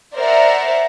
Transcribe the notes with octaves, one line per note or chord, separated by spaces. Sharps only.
A#4 C5 D5 E5 F#5 A#5